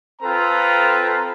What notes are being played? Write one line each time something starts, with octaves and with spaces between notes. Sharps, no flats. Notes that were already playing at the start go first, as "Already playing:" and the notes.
C4 F4 A4 B4 G5 A#5